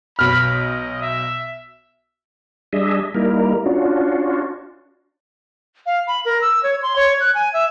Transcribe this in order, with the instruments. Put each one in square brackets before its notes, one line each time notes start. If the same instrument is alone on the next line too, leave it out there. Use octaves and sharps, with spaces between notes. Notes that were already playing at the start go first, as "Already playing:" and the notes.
[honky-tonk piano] B1 F6 [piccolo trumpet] B5
[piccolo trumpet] D#5
E5
[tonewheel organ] G3 D4 G#4 D#5 E5
G3 A#3 D#4 E4 A#4
C#4 D4 F4 F#4
[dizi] F5
B5
A#4
E6
C#5
C6
C#5
F#6
G#5
E5